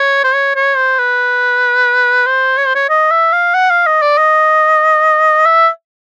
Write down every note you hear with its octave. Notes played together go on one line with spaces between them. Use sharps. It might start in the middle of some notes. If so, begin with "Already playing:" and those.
Already playing: C#5
C5
C#5
C#5
C5
B4
C5
C#5
C5
C#5
D#5
E5
F5
F#5
F5
D#5
D5
D#5
E5